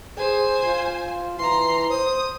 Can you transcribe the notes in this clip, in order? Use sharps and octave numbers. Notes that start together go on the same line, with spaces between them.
G#4 C5 G#5
F4
E3 A#5 C6
C5 D#6